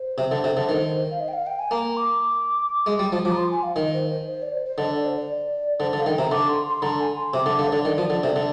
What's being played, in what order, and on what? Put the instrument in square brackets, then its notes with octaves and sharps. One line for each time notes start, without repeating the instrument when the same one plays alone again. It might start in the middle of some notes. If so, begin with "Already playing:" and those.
Already playing: [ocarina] C5
[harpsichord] C3
D3
C3
D3
D#3
[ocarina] F5
D#5
G5
F5
G5
G#5
[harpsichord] A#3 [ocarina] A#5
[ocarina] D6
[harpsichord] G#3
G3
F3
[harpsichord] F3 [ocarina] D6
[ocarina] A#5
C6
G#5
F5
[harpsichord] D#3 [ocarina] D#5
[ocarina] C5
C5
C5
D5
C5
C5
[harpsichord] D3 [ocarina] D#5
[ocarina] D5
C5
D5
[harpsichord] D3 [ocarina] C5
[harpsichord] D3
[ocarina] F5
[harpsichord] D#3 [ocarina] G5
[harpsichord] C3 [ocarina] A#5
[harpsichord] D3 [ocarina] D6
[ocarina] C6
C6
[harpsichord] D3 [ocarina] A#5
[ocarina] G#5
C6
[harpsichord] C3 [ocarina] D6
[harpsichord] D3 [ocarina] D6
[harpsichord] D3 [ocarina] F5
[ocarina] C5
[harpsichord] D3 [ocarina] D5
[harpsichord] D#3
F3
D3
C3
D3